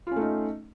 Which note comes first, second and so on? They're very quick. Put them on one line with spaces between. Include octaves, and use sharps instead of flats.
F4 C#4 A3 D#4